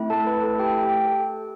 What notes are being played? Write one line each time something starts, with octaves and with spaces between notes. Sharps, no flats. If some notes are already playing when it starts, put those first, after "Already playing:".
Already playing: A3 C4 E4
A4 A5
B4 B5
A4 A5
G4 G5
G4 G5
A4